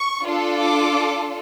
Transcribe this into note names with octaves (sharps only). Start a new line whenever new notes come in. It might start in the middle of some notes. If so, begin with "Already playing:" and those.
Already playing: C#6
D4 F4 A4
D6